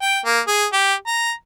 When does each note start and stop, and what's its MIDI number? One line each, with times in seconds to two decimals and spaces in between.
0.02 0.20 79
0.25 0.40 58
0.48 0.65 68
0.73 0.94 67
1.07 1.32 82